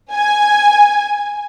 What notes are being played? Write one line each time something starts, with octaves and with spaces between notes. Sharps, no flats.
G#5